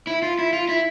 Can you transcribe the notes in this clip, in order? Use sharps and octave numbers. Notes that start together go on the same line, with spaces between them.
E4
F4
E4
F4
E4